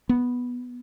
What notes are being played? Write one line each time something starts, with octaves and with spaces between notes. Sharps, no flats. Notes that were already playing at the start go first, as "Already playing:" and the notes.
B3